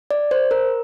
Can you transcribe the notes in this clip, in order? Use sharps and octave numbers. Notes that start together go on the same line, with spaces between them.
D5
C5
A#4